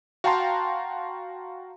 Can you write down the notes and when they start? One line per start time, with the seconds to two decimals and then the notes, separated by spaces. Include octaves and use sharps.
0.24 F#4 F5 G5 A5 A#5 C6